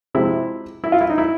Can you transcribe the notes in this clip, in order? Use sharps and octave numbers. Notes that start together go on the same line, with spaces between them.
C3 F3 G#3 C4 E4
E4
F4
E4
D#4
E4